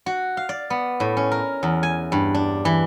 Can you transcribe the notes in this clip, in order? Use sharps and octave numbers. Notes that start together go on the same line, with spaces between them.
F#4
F5
D5
B3
A2
C#4
A#4
E2
G#5
G2
D4
E3